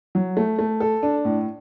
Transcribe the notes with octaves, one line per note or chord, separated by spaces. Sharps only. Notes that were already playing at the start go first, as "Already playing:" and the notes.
F#3
A3
A3
A4
D4
A2